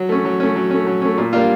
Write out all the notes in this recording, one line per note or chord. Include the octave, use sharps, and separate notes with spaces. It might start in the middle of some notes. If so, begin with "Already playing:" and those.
Already playing: F#3
A3 C#4
F#3
A3 C#4
F#3
A3 C#4
F#3
A3 C#4
A#2
G3 A#3 D4 F4